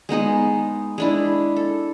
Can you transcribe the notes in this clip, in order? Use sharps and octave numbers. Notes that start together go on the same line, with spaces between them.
G#3 B3 D#4 G#4
G#3 D4 E4
A4